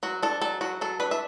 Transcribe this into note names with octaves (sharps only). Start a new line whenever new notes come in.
F#3 F#4
D4 A4
F#3 A4
F#3 F#4
F#3 A4
D4 B4
E5